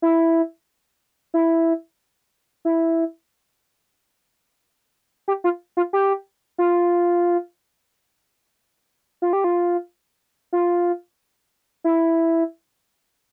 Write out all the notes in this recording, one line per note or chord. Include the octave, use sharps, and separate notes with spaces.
E4
E4
E4
G4
F4
F4
G4
F4
F4
G4
F4
F4
E4